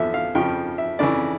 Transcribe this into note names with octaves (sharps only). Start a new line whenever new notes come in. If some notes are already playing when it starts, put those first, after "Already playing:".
Already playing: E2 D3 F3 E5
F5
F2 C#3 F3 G5
E5
F2 C#3 E3 D5